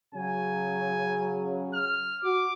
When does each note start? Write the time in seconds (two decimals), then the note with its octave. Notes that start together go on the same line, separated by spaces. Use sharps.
0.14 C#3 F#3 G#5
1.74 F6
2.23 F#4 D6